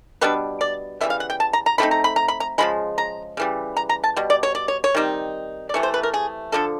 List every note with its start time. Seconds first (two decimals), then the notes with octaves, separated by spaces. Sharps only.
0.21 B2 G3 B3 D4 B4
0.61 D5
1.01 C#3 E3 G3 B3 E5
1.10 F5
1.20 F#5
1.30 G5
1.40 A5
1.53 A#5
1.66 A#5
1.78 F3 A3 C4 D#4 B5
1.91 A#5
2.04 B5
2.16 A#5
2.28 B5
2.40 A#5
2.58 C#3 F3 G#3 B5
2.98 A#5
3.37 C#3 E3 G3
3.77 A#5
3.89 A#5
4.04 A5
4.16 B2 G3
4.30 D5
4.43 C#5
4.55 D5
4.68 C#5
4.84 C#5
4.95 D#3 G3 C4 D#4
5.69 D5
5.74 C3 E3 A3 C#5
5.83 C5
5.94 B4
6.03 A#4
6.14 G#4
6.52 D3 F3 A#3 A4